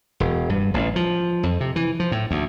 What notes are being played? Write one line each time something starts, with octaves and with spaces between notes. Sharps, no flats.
E1
G2
A1
F3
F2
C3
E3
F3
A2
D2